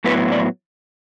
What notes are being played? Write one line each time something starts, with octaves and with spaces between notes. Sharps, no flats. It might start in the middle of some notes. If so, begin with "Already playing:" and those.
A2 F#3 B3 E4 B4
D5